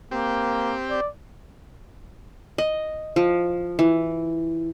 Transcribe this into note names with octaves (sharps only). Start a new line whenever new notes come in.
A#3 C4 G4
D5
D#5
F3
E3